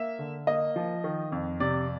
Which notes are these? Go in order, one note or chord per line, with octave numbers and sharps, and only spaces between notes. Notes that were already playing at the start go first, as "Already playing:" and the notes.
Already playing: A#3 E5
D3
A#3 D#5
F3
D#3
F2
C3 D5